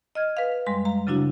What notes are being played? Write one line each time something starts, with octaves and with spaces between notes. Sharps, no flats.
D#5 F6 G#6
B4 F5
F#2 G3 G#3 C6
F5 A#5
C#3 F#3 D4 E4 F#4